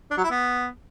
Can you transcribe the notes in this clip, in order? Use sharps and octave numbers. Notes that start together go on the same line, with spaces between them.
D4
F#3
E4
B3